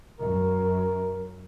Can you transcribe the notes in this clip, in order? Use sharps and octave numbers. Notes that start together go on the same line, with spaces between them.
F#2 A#4